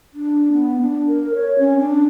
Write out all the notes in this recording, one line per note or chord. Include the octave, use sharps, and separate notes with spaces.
D4
B3
D4
A#4
C#5
C#4
D4